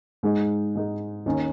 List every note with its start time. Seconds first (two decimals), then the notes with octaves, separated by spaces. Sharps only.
0.23 G#2 G#3 D#4 G#4
0.75 G#2 G#3 D#4 G#4
1.26 D#2 D#3 C#4